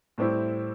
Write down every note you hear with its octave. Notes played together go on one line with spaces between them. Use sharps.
A2 G3 C4 E4